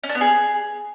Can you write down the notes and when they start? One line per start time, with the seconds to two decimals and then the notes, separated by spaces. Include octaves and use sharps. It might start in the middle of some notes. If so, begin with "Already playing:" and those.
0.03 C#4
0.09 D4
0.15 B3
0.21 G#4